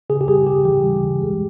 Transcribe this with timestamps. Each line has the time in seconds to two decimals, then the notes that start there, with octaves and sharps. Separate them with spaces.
0.10 C#3 G#4
0.21 G4
0.28 G3 G#4
0.47 C#3 G4
0.65 E3 G4
0.84 G3
1.03 C#3
1.21 G#3